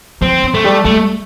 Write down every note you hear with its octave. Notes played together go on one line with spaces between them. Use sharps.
F3 C4
F3
A3
G3
G3 A3